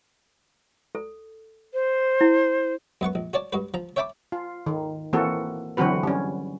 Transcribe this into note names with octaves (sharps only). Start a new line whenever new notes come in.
A4
C5
E4
F#2 B3 F#5 C#6
A#1
F#4 C#5 D5 A5
G2 F#4 B4
F3 A#5
C#5 E5 G5 A5 B5 D6
F4
D#3
E3 A#3 C4 F#4 A4
D3 E3 F#3 C4 F#4 B4
G3 C#4